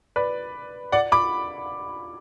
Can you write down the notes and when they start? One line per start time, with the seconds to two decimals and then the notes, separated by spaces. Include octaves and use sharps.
0.16 B4 D5
0.92 D5 F#5
1.12 B5 D6